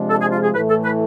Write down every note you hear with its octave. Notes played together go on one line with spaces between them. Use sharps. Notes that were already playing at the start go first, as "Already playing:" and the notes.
Already playing: C3 F3 G#3 D4
A4
G#4
F4
G#4
A2 E3 A3 B4
A4
B4